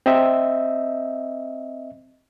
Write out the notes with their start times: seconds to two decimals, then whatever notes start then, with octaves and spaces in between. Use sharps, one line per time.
0.06 C4 D#5 E5